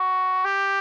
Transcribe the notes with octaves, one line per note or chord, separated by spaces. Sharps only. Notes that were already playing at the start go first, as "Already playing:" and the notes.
Already playing: F#4
G4